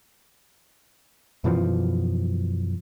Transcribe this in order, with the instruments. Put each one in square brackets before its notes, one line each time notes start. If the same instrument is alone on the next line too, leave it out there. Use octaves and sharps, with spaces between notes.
[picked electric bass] F#2 B2 E3 F3